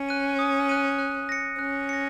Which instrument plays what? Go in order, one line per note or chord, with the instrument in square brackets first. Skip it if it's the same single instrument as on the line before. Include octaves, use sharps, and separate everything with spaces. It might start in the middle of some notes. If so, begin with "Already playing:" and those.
Already playing: [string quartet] C#4
[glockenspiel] F#6 D#7
D#6
F#6 D#7
F#6
A#6 C#7
[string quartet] C#4 [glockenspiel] F#6
[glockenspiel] A#6 C#7